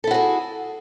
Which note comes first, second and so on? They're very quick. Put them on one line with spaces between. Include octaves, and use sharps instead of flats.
A4 E4 F#4 G#4